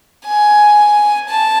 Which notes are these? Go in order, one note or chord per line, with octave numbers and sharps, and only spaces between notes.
G#5
A5